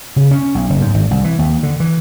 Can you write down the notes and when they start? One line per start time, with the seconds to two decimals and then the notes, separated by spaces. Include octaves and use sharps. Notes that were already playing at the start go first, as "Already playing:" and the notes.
0.16 C#3
0.31 C#4
0.55 B1
0.70 F#1
0.82 G#2
0.94 G#1
1.11 C2
1.24 E3
1.39 D#2
1.63 D3
1.80 E3